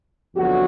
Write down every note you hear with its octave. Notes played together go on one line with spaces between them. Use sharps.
G1 F2 D3 F#3 F#4